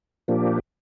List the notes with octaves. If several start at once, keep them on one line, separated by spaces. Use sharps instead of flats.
A#2 F3 A#3 D4 G4